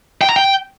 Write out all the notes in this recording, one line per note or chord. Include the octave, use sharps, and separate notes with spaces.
G5
A#5
G5